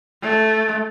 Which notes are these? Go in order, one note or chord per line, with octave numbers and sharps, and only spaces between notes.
A3